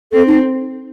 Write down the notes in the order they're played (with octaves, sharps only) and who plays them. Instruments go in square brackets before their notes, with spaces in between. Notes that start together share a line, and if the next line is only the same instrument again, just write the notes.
[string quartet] C4 [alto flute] A4
[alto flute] D#4